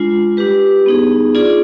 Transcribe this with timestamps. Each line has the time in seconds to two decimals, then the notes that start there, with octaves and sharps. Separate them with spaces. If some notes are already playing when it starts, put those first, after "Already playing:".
Already playing: G#3 D4 F4
0.37 G3 D4 G4 B4
0.86 B3 D#4 G#4
1.35 D4 F4 G#4 D5